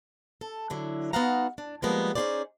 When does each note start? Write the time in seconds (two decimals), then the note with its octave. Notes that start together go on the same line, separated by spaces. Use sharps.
0.41 A4
0.70 D3 F#3 E4
1.13 B3 D#4 F#4 F5 F#5 A#5
1.58 D4
1.82 F3 G3 G#3 A#3 B3
2.15 C#4 D#4 F4 G#4 C5 D5